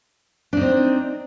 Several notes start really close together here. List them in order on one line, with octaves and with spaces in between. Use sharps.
D4 D#4 C4